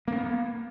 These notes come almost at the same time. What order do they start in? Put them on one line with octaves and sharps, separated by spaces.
A#3 C#4 B3